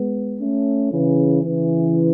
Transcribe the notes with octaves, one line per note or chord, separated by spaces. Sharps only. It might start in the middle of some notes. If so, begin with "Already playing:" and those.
Already playing: G#3 B3
A3 C#4
C#3 E3
C#3 E3